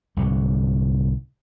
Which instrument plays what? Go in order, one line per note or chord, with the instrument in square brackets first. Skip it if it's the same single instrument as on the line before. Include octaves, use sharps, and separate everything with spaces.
[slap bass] C2 G#2 D3